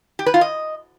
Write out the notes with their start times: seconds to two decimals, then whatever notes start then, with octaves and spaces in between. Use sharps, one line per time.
0.19 G4
0.26 B4
0.34 F4
0.41 D#5